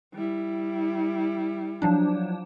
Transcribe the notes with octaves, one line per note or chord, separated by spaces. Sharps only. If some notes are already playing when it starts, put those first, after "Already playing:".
G3 E4
F3 F#3 D4